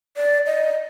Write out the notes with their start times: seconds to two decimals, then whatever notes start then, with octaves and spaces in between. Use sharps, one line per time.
0.17 D5
0.47 D#5